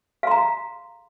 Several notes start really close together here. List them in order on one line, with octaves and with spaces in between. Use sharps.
F5 C6 A#5